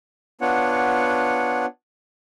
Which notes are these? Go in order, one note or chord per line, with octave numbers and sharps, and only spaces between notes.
B3 D4 F4 C#5 F#5